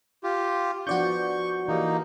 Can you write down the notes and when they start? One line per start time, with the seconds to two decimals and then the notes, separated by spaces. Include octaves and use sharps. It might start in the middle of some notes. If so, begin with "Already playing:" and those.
0.23 F4 G4
0.87 F3 B3 D4 F#4 D5 C#6 G6
1.68 E3 A#3 D#4 G4